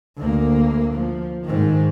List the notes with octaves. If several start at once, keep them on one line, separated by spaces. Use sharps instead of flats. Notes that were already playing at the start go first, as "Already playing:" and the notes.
D2 A#3
F3
G#2 D#3